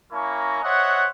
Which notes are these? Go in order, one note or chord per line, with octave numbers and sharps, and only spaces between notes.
A#3 C#4 E4 A#4 A#5 C#6
C5 C#5 D#5 E5 F#5